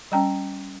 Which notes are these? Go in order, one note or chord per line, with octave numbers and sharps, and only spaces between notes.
G3 C#4 G5 A#5